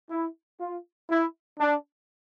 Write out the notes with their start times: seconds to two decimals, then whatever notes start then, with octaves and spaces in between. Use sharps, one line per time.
0.10 E4
0.61 F4
1.09 E4
1.59 D4